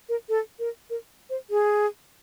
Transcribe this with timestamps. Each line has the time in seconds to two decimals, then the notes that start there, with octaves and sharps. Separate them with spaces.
0.09 A#4
0.29 A4
0.59 A#4
0.90 A#4
1.30 C5
1.50 G#4